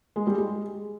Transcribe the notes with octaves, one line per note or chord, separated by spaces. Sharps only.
G#3
G3
G#3